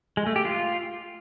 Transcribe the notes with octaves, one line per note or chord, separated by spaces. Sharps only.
G#3
A3
G4
F4